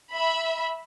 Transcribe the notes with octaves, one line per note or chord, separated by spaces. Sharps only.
E5 B5